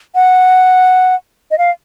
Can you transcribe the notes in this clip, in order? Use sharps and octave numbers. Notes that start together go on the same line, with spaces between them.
F#5
D#5
F5